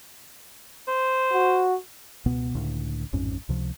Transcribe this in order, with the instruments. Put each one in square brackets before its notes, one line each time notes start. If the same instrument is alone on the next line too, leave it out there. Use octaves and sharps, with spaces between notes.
[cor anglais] C5
[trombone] F#4
[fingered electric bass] C#2 B2 B3
C#2 A2 D3
A1 F2 G#2 C#4
C#2 C3 F3